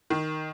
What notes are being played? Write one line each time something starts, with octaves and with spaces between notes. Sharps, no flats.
D#3